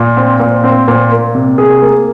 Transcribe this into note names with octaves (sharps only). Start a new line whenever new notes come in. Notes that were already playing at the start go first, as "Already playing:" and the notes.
Already playing: A#2
C4
A#2
C4
A#2
A#3
C3
G#4
A#3